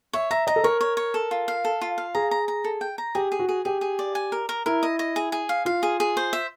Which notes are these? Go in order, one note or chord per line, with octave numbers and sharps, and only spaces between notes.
C#5 E5
E5 A#5
D#5 A#5
A4
A#4 C#5
C#5
C#5
A4
F4
F5
A4
F4
F5
G#4 A#5
A#5
A#5
A4
G5
A#5
G4 G#4
G#4
F#4
G#4
G4 G#4
G#4
D5
G#5
A#4
A#4
E4 A#4
D#5
D#5
G#4
G#4
F5
F4 F5
G#4
G#4
C5
E5